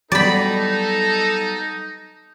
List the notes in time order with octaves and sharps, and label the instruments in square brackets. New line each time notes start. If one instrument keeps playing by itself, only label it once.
[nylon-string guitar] F#3 G3 B3 [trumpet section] D#4 [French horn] A4 [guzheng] D5 B5